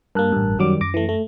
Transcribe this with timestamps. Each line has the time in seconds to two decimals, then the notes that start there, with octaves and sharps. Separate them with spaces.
0.15 G2 A#3 A#4 A5 F#6
0.32 A1 G2
0.59 F#2 D#3 F#3 G3 D6
0.81 F#2 D6 A#6
0.94 E3 A3
1.09 A3